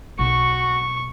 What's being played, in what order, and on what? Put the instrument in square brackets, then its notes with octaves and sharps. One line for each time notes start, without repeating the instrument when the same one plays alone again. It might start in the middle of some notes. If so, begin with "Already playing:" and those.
[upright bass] B1 B2 [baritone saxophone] F#4 [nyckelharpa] C#6